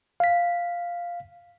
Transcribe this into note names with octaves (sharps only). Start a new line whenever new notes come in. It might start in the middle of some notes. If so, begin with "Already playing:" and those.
F5 B6